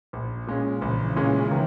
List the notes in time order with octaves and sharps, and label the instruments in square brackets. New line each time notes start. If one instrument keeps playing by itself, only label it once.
[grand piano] A#1
A#2 G#3 C#4
[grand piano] A#1 [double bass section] C#3 E3
[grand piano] A#2 G#3 C#4
D#3